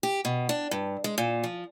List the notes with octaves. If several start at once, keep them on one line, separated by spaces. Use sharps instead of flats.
G4
B2
D4
G2
G#3
A#2
F3